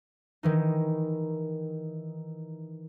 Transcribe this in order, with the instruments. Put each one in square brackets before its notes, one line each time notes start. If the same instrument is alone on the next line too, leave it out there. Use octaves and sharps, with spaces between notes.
[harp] D#3 E3 D#4